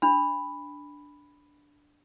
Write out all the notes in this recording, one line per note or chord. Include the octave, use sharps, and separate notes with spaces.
D4 B5